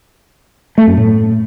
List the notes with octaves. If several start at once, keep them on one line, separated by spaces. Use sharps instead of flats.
A3
F#2
A2